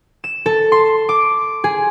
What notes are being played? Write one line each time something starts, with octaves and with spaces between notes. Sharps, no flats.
E7
A4
C6
D6
G#4